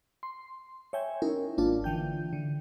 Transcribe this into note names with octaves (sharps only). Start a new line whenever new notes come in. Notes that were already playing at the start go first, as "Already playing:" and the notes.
C6
C#5 E5 G5 G#5
C#4 D#4 E4 A#4
G#1 A#3 D4 F4 A5
D3 E3 G5 G6
D3